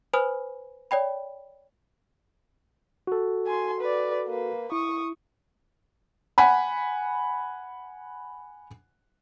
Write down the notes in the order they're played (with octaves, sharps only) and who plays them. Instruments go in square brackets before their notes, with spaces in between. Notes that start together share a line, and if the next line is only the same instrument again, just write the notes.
[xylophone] B4 C5 G#5 B5 D#6 F6
C#5 D5 G5 B5
[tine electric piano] F#4 A4
[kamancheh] G#5 C6
B4 D5
A#3 B4
[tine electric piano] E4 [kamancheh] C#6 D#6
[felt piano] F#5 G#5 B5